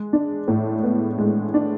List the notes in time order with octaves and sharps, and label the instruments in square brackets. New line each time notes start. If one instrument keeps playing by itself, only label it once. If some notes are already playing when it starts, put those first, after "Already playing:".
Already playing: [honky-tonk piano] G#3
D4
A2
B3
G#3
D4